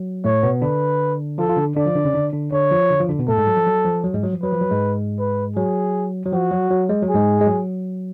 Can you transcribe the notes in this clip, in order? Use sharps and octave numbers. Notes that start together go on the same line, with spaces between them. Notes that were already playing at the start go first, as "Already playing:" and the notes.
Already playing: F#3
A2 A3 C#5
B2 B3
D3 D4 B4
F3 F4 A4
F4
D3 D4
D3 D4 D5
F3 F4
D3 D4
C#3 C#4
D3 D4
D3 D4
D3 D4 C#5
F3 F4
D3 D4
F3 F4
D3 D4
B2 B3
A2 A3 A4
G#2 G#3
F#3
F3
F#3
F3
F#3
G#2 G#3
F#3
F3
F#3 B4
F3
F#3
G#2 G#3
B4
F#3 G#4
F#3
F3 F#4
F#3
F#3
G#3
F#3
G#4
G#2 G#3
G#3
F#3